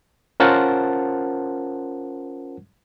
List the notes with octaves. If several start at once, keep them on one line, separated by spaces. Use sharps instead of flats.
C#4 F4 A#4 C5 F#5 A5